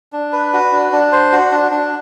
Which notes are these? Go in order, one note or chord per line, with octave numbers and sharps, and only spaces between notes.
D4
B4
F#4
D4
D4
C5
F#4
D4
D4